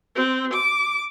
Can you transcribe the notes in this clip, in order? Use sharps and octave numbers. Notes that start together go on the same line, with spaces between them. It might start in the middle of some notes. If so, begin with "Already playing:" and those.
C4
D6